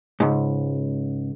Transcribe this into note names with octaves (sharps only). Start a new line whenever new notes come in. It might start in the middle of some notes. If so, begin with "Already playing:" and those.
C#2 G#2